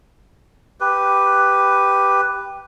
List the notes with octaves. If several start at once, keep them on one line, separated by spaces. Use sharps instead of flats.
G4 B4